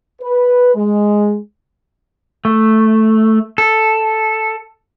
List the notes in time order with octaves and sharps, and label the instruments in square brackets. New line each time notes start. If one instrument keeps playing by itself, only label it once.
[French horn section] B4
G#3
[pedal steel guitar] A3
A4